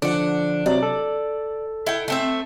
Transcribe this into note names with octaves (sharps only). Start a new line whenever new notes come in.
D3 F3 D4 F#5
C3 F#3 D5
A4
E4 F#5 G5
A3 C4 E5